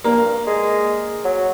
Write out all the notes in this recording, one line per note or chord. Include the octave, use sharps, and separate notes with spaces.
G2 A#3
G#3
F#3